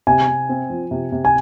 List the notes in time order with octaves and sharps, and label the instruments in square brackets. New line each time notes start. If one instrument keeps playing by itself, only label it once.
[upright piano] C3 [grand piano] G#5
[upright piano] C3
C4
F3
C3
C3
[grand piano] G#5